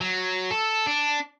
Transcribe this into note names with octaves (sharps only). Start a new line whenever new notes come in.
F#3
A4
D4